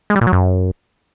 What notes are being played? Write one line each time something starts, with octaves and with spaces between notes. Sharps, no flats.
G#3
G3
A#2
F#3
F#2